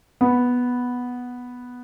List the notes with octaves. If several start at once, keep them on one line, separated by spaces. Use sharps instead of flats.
B3